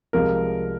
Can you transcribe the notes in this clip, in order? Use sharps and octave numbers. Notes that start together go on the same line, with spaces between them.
C2 C3 F3 G#3 A#4